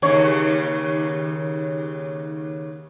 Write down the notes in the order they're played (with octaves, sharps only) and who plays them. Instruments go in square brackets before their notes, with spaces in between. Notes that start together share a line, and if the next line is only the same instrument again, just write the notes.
[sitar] D#2 C#3 C#5